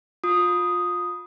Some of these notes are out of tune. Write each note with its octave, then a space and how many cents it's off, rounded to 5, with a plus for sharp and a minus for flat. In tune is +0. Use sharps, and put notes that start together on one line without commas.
F4 +25 D#6 +0